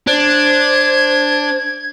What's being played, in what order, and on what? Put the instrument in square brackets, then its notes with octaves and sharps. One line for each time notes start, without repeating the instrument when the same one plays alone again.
[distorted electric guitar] D4 [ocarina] C5 [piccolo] G#6